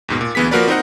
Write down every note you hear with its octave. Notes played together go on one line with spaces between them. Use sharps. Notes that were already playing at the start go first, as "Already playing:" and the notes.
D#2 G#2 B2
A#2
D2 E3 B3 G#4 B6
F3 A#3 F#4 A#4 B4 D5
C4 D#4 A#4 C5 D#5 F#5